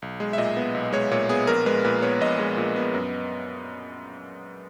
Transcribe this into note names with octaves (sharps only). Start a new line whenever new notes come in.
B1
G#3
E5
A#2 D#5
B3
B1
G#3 C#5
A#2 C#5
B3 G#4
A#1 A#4
G#3 B4
A#2 B4
B3 C#5
A#1 D#5
G#3
A#2
B3
F#2